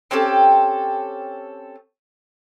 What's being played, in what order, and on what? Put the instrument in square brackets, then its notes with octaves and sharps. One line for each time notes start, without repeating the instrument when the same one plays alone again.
[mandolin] C4 C#4 G4 A4